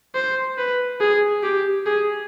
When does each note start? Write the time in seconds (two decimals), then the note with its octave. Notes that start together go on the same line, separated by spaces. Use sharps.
0.15 C5
0.58 B4
1.00 G#4
1.43 G4
1.86 G#4